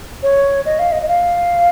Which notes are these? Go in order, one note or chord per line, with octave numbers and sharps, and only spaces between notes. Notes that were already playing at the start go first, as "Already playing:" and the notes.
C#5
D#5
F5
D#5
D#5
F5